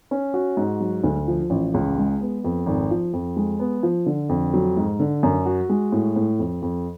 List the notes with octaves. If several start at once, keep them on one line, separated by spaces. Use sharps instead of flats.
C#4
F#4
G#2
F#3
D2
F3
A1
C#2
G#3
B3
F2
G#1
F3
F2
G#3
B3
F3
D3
F2
F#3
G#2
D3
F#2
F#4
G#3
A2
A2
F2
F2